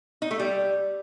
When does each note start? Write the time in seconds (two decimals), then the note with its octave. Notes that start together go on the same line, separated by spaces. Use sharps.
0.22 D#4
0.31 A3
0.40 G3